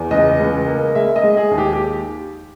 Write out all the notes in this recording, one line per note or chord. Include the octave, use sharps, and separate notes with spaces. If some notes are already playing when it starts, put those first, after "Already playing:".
Already playing: E2
C#2 D#5
C#2
A#3
G#3 E5
D#5
G#3
G#4
D#2
G4
G4